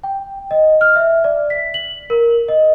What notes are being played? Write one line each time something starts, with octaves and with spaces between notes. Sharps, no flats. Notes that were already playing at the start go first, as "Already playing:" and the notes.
G5
D#5
F6
E5
D5
B6
F#7
A#4
D#5